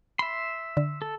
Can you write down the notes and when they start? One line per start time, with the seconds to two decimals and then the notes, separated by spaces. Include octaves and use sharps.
0.19 E5 B5 C6
0.77 D3
1.02 A4